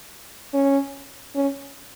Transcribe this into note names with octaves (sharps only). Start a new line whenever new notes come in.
C#4
C#4